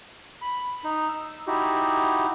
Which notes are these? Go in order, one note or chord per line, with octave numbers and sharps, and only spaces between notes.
B5
D#4
E6
D#4 E4 F#4 G4